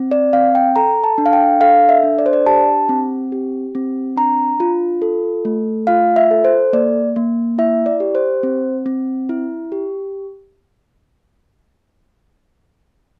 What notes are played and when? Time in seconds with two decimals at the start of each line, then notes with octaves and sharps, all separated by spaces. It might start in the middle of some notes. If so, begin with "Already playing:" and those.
Already playing: C4
0.11 D5
0.33 C4 F5
0.55 G5
0.76 A4 A#5
1.04 A5
1.18 D4
1.26 F5
1.33 G5
1.61 A4 F5
1.89 E5
2.03 D4
2.19 D5
2.26 C5
2.33 D5
2.46 G4 A5
2.89 C4
3.32 G4
3.75 C4
4.16 D4 A#5
4.60 F4
5.02 A4
5.45 A3
5.87 F4 F5
6.16 E5
6.31 A4
6.44 C5
6.73 A#3 D5
7.16 A#3
7.58 E4 E5
7.86 D5
8.00 G4
8.15 C5
8.43 C4
8.86 C4
9.29 E4
9.72 G4